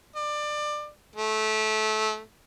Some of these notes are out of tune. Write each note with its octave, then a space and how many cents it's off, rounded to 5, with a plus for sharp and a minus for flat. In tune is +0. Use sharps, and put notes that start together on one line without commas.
D5 +25
A3 -20